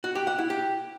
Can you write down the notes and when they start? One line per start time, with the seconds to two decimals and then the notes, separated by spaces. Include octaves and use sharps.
0.04 F#4
0.15 G4
0.27 F#5
0.38 E4
0.50 G4